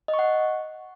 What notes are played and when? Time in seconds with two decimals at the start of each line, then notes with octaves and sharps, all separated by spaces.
0.08 D#5
0.14 C#6
0.19 F#5